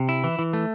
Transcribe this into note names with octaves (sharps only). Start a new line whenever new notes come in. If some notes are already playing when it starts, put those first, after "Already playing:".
Already playing: C3
E4
E3
E3
A3